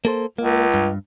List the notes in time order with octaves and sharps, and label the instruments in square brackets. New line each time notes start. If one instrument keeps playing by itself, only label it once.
[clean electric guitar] A#3 A4 C5
[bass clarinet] C#2 [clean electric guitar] A#3
[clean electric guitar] G2